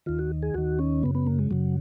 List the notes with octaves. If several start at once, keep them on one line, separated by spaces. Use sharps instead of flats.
D#2 D#3 F4
F#4
G#4
D#2 D#3 F#4
C#4
F#2 C#3 B3
B3
A#3
G#3
F#2 C#3 F#3